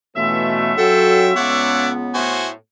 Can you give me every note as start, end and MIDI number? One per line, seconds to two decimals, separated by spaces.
0.16 0.73 47
0.16 0.73 52
0.16 0.73 57
0.16 1.89 61
0.16 1.89 65
0.16 1.89 76
0.78 1.33 54
0.78 1.33 66
0.78 1.31 69
0.78 1.30 79
1.36 2.19 37
1.36 2.56 59
1.36 1.89 73
1.36 1.89 74
1.36 1.89 78
2.14 2.52 45
2.14 2.48 66
2.14 2.48 72
2.14 2.48 80